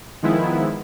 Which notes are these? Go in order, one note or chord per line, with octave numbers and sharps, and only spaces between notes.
D#3 F3 G#3 B3 E4